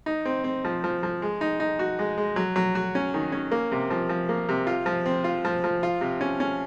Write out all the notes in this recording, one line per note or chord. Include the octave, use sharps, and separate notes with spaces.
D#4
C4
C4
F3
F3
F3
G#3
D#4
D#4
F#4
G#3
G#3
F#3
F#3
F#4
C#4
D#3
C#4
A#3
C3
F3
F3
A#3
C3
F4
F3
C4
F4
F3
F3
F4
C3
C#4
C#4